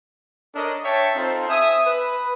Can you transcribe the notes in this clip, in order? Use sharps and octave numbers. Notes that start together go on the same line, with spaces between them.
D4 A4 A#4 C#5 D#5
C#5 E5 G5 A5
C4 D#4 F4 A4 C5
E5 G#5 D#6
B4